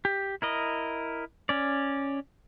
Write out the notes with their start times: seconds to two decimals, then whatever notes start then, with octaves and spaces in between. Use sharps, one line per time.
0.05 G4
0.42 E4 A#4 D#5
1.49 C#4 D5